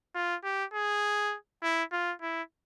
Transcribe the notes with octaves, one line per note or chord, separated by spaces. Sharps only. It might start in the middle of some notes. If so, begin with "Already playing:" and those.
F4
G4
G#4
E4
F4
E4